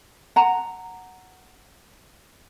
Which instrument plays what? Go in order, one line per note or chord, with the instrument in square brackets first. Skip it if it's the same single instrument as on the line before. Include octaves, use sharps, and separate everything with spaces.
[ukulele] F#5 A#5